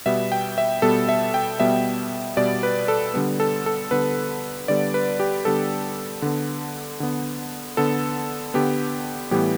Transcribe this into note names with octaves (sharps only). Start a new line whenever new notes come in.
B2 G3 B3 E5
G5
E5
B2 G3 B3 A4
E5
G5
B2 G3 B3 E5
B2 G3 B3 D5
B4
A4
D3 G3 B3
A4
A4
D3 G3 B3 B4
D3 G3 B3 D5
B4
G4
D3 G3 B3 A4
D3 B3
D3 B3
D3 B3 A4
D3 B3 G4
A2 E3 G3 B3 G4